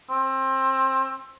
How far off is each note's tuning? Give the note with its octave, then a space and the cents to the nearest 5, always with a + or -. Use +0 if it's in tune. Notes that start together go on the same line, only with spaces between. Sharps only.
C4 +25